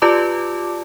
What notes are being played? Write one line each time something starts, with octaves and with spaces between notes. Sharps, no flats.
F4 G4 B4 D5 A5 D6